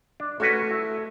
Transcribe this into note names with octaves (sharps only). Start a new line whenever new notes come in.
D4
A3 C#4 F#4 B4
E4